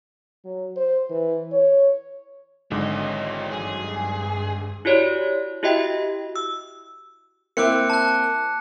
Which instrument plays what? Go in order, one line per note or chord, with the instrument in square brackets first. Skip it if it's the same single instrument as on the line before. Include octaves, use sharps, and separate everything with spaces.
[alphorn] F#3
C5
E3
C#5
[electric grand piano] G#1 G#2 D3 [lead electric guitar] E3 D#5 [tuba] F#3
[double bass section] G2 [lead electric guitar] G#4
[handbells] E4 F#4 G4 C#5 D5
E4 F#4 G4 D#5 E5 G5
E6
[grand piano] A#3 C4 E4 [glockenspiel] D6 F#6 C#7
[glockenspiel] A5 F#6